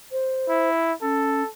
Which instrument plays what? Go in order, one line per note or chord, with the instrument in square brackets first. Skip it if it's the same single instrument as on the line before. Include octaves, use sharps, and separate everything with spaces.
[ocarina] C5
[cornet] E4
[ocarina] C#4 [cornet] A4